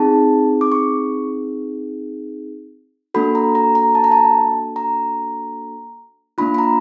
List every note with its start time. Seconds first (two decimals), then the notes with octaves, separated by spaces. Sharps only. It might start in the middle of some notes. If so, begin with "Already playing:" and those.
Already playing: C4 D#4 G#4 A5
0.61 D6
0.72 C#6
3.14 A#3 D4 F#4 A4 B5
3.35 A#5
3.55 A#5
3.75 A#5
3.95 A5
4.04 A#5
4.12 A5
4.76 A#5
6.38 A#3 D4 F4 B5
6.54 B5
6.58 A#5